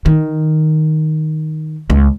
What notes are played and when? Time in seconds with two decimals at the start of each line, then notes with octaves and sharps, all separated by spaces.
0.06 D#3
1.90 C#2